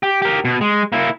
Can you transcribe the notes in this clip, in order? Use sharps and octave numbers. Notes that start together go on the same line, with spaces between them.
G4
G4 A#4
B2
G#3
A#3 E4